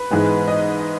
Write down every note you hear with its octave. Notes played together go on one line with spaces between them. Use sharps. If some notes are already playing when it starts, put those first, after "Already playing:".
Already playing: B4
G#2 E3 G#3 B3
D#5